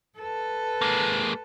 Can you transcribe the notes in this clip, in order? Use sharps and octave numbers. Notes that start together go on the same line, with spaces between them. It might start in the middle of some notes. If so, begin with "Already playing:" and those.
A4 B4
G#3 A#3